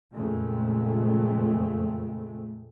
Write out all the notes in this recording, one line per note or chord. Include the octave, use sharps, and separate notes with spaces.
F2 A#2 C#3 G#3 A3